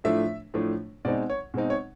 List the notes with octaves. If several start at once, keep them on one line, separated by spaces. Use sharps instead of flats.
A2 F3 A3 D4 E5
A2 F3 A3 D4
B2 G#3 C4 D#4 D5
C#5
B2 G#3 C4 D#4
C#5